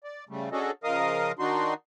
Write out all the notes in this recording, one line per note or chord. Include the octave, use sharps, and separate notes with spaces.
D5
C#3 G3 A3
C#4 D4 F#4 G#4 A4 D#5
C#3 F3 A#4 D#5 F5 D#6
D#3 D4 D#4 F#4 C6